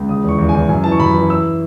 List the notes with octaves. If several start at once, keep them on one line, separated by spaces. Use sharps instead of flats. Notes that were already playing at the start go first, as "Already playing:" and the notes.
Already playing: C#2
C#3 D#6
E2 C#6
E2
G#5
E2
F#2 G#5
E3 A5
C#6
F#2 B5
E3
E3 E6